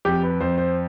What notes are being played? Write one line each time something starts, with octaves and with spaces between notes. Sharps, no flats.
F2 G4
B4
F2 C5
C5